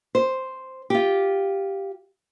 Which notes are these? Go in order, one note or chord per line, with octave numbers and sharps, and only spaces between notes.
C5
F4 G4